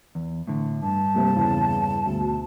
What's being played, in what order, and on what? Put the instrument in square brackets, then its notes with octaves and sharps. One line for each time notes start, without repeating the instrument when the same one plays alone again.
[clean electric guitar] E2
A2 D3
[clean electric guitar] G2 [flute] A5
[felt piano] C3 G3 A#3
E2 C#3
D2 B2